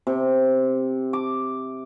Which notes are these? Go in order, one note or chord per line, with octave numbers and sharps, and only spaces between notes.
C3
D6